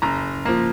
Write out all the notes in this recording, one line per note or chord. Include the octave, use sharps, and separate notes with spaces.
F#1 A#5
F3 A#3